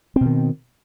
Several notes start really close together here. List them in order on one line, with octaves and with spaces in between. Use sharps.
C4 B2 D#3